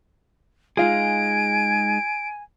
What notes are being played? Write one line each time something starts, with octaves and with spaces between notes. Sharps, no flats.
G#3 D#4 F4 G#4 F5 G#5 D7